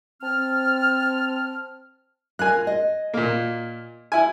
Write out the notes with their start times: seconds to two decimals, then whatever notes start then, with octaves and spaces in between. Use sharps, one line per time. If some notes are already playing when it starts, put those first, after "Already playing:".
0.22 C4 A5 F6
2.39 F4 A#4 F5 G#5 F#6
2.67 D#5
3.14 A#2 A#3
4.12 E4 G#5